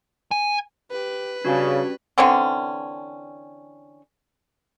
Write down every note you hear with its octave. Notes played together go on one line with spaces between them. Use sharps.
G#5
G4 B4
C#3 G3 C#4 D4 F#4 D5
D3 E3 C4 C#4